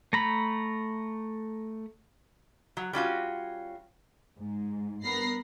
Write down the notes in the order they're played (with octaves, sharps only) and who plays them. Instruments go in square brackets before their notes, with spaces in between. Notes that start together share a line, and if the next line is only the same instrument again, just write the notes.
[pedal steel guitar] A3 A#5 B5
[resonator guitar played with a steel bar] F#3
G3 C#4 F4 F#4
[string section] G#2
G2 B3 A#4 B5 A#6 C7